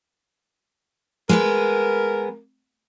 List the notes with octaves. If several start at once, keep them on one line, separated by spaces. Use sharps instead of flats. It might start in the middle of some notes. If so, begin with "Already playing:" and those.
G#3 B3 A#4 B4